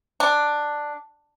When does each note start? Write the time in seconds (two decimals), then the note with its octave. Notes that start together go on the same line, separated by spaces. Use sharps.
0.20 D4